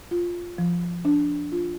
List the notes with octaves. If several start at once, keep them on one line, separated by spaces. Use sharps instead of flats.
F4
F3
D4
F4